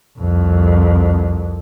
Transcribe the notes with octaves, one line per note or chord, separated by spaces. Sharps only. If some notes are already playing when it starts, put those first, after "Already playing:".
C2 F2